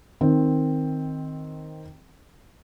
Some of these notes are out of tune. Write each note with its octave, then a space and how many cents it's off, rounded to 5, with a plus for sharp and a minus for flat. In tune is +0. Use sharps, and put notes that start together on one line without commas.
D#3 +0 C4 +0